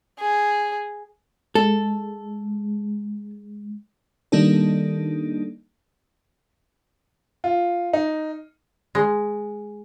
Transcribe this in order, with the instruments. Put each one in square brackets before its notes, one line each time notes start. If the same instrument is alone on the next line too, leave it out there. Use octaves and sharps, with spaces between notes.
[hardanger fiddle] G#4
[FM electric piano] G#3 [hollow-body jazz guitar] A4
[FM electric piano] D#3 G3 A#3 D4 D#4 A4
[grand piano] F4
D#4
[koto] G#3